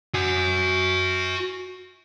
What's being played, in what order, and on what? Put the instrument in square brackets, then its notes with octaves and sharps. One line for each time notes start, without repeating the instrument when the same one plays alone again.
[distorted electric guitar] F#4 G#5